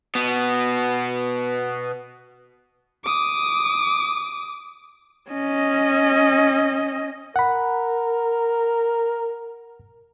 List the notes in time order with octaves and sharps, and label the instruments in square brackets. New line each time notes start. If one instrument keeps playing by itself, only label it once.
[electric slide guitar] B2 B3
[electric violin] D6 D#6
[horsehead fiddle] C#4 D#5
[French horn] A#4 [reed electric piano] F#5 B5